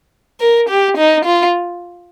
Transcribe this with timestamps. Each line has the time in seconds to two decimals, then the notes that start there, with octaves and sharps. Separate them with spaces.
0.40 A#4
0.69 G4
0.98 D#4
1.25 F4